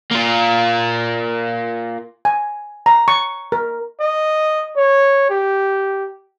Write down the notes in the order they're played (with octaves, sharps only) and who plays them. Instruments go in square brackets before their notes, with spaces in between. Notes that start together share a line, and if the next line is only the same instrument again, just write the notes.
[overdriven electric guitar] A#3 F4
[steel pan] G#5
A#5
C#6
A#4
[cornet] D#5
C#5
G4